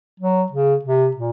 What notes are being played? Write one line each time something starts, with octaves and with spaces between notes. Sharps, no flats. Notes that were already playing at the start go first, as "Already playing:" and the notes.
F#3
C#3
C3
A#2